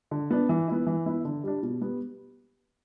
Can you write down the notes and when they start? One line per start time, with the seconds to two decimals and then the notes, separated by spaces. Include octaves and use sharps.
0.11 D3
0.30 B3 D4
0.49 E3
0.68 B3 E4
0.87 E3
1.06 B3 E4
1.25 D3
1.44 G3 D4
1.63 B2
1.81 G3 B3